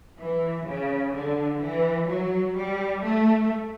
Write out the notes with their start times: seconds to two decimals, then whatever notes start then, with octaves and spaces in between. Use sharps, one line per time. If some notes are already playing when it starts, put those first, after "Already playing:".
0.19 E3
0.67 C#3
1.15 D3
1.62 E3
2.09 F#3
2.57 G3
3.05 A3